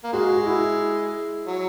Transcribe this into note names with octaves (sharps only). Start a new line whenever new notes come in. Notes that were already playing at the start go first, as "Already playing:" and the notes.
A#3
G#3 F#4
F#4
E4
F#3